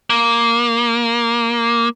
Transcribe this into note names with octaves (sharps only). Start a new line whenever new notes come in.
A#3